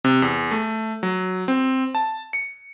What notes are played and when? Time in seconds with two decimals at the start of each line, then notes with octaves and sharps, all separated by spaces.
0.04 C3
0.22 E2
0.51 A3
1.03 F#3
1.48 C4
1.95 A5
2.33 C#7